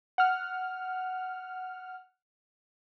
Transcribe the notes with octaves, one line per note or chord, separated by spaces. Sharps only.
F#5 F6